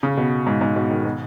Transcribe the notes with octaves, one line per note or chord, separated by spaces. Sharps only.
C#3
B2
G#2
G#2
B2
D#3
B2